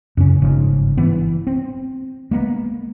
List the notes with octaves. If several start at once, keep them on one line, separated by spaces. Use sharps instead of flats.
F#2 C#3 C#4
G1 G#2 C#3 F3
E3 B3
C4
G#3 A#3 B3